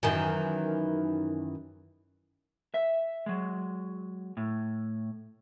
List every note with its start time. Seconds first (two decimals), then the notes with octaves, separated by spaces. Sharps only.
0.03 F#2 D#3 E3
2.74 E5
3.26 F#3 G#3
4.37 A2